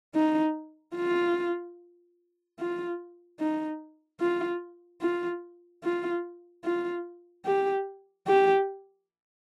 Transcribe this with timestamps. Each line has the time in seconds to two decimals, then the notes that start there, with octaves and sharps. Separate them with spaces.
0.15 D#4
0.96 F4
2.59 F4
3.40 D#4
4.21 F4
5.02 F4
5.84 F4
6.64 F4
7.46 G4
8.27 G4